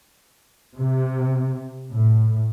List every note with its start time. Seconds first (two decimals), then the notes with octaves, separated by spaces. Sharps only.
0.75 C3
1.90 A2